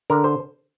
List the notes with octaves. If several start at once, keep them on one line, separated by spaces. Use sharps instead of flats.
D3 A#4
C5